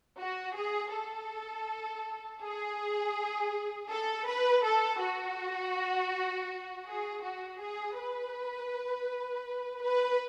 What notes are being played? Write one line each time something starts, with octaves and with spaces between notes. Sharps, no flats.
F#4
G#4
A4
G#4
A4
B4
A4
F#4
G#4
F#4
G#4
B4
B4